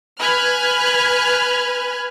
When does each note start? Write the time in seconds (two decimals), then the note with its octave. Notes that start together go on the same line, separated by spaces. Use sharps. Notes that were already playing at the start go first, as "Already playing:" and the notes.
0.19 B4 G#5 B5 F6 F#6 G#6